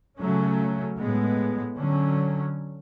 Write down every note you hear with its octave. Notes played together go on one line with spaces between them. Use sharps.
C#3 F#3 A3 C#4
A2 G#3 B3
D3 F#3 C#4